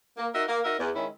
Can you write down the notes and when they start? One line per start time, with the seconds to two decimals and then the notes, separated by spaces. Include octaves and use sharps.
0.17 A#3
0.33 D#4 F#4 A#4 E5
0.48 A#3
0.64 D#4 F#4 A#4 E5
0.79 E2
0.94 D#3 G#3 C#4 E4